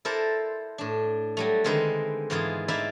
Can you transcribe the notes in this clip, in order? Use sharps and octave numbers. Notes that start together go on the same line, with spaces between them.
E4 A4 A#4 C5 D5
A2 D4
F#3 G3 A3
D3 D#3 G#3 C4 D#4 B4
G#2 E3 B3 F4 G#4
D#4 E4 B4 D5 E5 F5